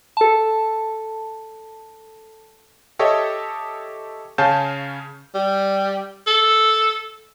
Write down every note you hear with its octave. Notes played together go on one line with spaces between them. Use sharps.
A4 A5
G4 A4 C#5 D#5 E5
C#3 C#4 F5 G#5 A5 G6
G3
A4